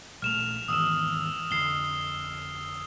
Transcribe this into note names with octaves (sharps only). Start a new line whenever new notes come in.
A#1 E3 A3 F6 E7 F7
G#1 E2 D#6 E6 E7
F2 D3 C7 G7